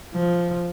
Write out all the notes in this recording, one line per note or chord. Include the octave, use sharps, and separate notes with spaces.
F3